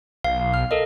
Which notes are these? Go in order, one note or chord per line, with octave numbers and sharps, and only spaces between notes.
B1 F5
F6
A4 A#4 D#5